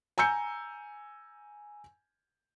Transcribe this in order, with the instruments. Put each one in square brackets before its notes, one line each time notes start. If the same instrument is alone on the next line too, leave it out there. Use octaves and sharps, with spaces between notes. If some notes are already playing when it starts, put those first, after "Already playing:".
[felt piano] G#5 A#5 E6 G6 C#7